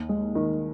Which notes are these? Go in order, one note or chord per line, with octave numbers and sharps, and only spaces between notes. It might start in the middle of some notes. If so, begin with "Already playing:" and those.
Already playing: D#2
G#3
D#3